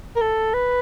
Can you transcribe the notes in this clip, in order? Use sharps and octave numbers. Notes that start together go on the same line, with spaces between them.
A#4
A4
B4